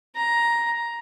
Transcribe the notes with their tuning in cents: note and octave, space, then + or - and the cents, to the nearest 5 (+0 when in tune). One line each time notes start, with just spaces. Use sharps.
A#5 +10